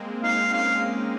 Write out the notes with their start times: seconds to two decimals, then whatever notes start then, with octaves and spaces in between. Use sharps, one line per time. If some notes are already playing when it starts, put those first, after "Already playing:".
Already playing: G#3 A#3 C4
0.24 C4 D#4 F5
0.53 A#3 C#4 F5